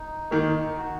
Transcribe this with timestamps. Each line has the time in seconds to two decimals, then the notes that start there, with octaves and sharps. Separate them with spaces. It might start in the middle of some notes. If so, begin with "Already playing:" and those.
Already playing: D#4
0.31 D#3 A#3
0.78 F#4